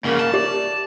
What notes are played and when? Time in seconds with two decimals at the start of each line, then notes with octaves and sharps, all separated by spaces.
0.04 G#2 C#3 A#3
0.19 A5
0.34 G4 D5 E5